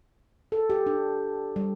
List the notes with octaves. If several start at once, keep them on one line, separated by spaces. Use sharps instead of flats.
A4
G4
D4
G3